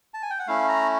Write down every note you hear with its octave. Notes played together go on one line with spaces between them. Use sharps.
A5
G#5
G5
F#5
A3 C#4 E4 F5
A#5